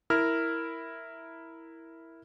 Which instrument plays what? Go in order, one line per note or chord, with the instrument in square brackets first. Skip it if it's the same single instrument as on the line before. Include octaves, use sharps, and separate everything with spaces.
[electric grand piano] E4 A#4 F6